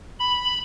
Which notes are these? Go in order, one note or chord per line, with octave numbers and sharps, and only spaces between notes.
B5